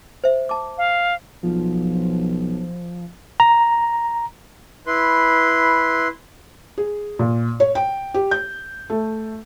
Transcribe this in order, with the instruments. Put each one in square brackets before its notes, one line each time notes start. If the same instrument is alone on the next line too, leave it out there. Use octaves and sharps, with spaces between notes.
[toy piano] C5 E5
A5 D6
[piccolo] F5
[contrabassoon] B1 [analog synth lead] F3
[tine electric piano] A#5
[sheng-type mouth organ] E4 B4 C6
[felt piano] G#4
A#2
C#5
G5
G4
G6
A3